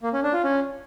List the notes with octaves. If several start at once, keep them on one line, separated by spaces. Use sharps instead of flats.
A#3
C#4
D4
F4
C#4